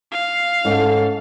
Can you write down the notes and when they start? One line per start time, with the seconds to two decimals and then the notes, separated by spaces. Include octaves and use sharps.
0.11 F5
0.65 G#2 C#4 A4